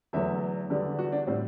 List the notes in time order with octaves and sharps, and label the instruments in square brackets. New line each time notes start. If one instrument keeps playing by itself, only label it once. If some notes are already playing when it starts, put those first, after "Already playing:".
[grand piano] E2 D3 F#3 A3 E5
E2 D3 G3
F#4
D4
A2 G3 C4